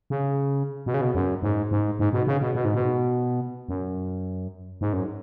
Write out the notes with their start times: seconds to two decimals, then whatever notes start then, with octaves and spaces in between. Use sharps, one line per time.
0.10 C#3
0.86 B2
0.94 C#3
1.01 B2
1.15 F#2
1.43 G#2
1.71 G#2
1.99 G#2
2.13 B2
2.27 C#3
2.41 B2
2.55 B2
2.65 G#2
2.74 B2
3.69 F#2
4.81 G#2
4.93 F#2